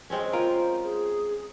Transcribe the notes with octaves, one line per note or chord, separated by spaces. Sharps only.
G#3 C4 C#4
F4 A#4 C5
G#4